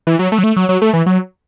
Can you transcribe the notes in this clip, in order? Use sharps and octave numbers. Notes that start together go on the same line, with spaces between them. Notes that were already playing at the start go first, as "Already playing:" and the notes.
E3
F#3
A3
F#3
A3
F#3
F#3
A3
E3
F#3